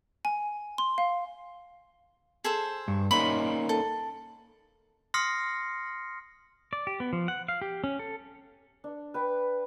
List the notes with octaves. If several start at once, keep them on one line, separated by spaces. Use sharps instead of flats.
G#5
C6
F5
G#4 A4 C5
G2
A#3 C#4 D#4 B5 C6
A4
C6 D#6 F6 A#6 C7 C#7
D5
G4
B3
F3
F#5
F5
G4
C#4
A4
D4
B4 G5